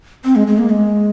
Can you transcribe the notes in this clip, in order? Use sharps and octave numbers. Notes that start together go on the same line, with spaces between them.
C4
G#3
G#3
A#3
G#3